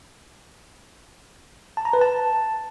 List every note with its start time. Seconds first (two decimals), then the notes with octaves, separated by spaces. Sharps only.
1.77 A5
1.85 A#5
1.93 B4
2.02 A5